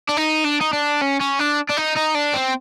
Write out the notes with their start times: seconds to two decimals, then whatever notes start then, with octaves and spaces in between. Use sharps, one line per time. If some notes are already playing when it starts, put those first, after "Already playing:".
0.09 D4
0.17 D#4
0.45 D4
0.61 D#4
0.73 D4
1.01 C#4
1.20 C#4
1.39 D4
1.69 D4
1.77 D#4
1.96 D#4
2.15 D4
2.34 C4